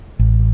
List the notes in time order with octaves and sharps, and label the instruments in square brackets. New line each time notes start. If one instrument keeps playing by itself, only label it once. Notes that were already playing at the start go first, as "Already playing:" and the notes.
[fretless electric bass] A1